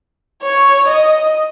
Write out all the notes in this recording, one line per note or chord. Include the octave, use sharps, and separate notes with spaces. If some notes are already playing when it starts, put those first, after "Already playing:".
C#5
D#5